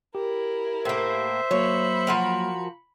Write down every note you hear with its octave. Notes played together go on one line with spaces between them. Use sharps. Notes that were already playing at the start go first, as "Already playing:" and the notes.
E4 G4 A#4
A2 A#3 C5 E5
F#3 A#3 C#5 B5 C#7
F3 F#4 A#4